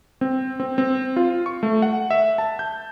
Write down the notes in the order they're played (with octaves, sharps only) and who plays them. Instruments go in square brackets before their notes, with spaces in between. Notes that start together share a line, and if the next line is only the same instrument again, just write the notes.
[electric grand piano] C4
C4
C4
F4
C#6
A3
F#5
E5
A5
G6